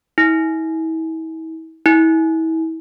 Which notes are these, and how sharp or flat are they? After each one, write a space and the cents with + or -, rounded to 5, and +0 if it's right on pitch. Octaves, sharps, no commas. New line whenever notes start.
E4 -40
E4 -35